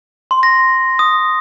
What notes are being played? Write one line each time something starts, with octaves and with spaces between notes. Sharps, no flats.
C6
A#6
D#6